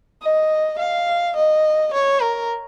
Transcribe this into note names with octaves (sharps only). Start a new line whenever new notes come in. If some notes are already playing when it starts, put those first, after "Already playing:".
D#5
F5
D#5
C#5
A#4